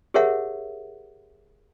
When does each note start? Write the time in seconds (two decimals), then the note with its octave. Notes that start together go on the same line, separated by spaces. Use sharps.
0.14 G4 G#4 A#4 C#5 E5 F#5